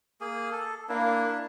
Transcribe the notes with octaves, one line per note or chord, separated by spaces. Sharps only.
A#3 G#4
A4
A#3 D4 E4